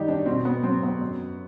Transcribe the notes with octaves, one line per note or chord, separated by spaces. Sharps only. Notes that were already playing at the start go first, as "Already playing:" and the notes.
Already playing: F#2 D#3 G3 D#4 G4
D4
B2 C4
B3
F#3 C4
B3
F#2